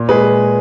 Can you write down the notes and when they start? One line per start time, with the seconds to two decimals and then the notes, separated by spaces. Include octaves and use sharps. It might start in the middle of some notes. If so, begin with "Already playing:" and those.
Already playing: A#2
0.09 G#3 G#4 B4